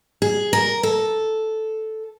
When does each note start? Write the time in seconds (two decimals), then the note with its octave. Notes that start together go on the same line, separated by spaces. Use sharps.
0.22 G#4
0.53 A#4
0.83 A4